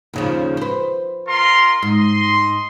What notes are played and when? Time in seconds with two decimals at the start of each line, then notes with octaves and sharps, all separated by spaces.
0.14 D#2 C#3 F3
0.57 B4 C5
1.28 F4 A#4 C6
1.82 G#2 D#5 C6